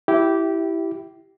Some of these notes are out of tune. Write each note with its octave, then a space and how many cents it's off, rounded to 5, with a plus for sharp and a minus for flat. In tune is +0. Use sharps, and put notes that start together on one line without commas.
E4 +0 G4 -15